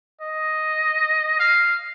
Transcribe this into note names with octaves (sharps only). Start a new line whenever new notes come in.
D#5
F5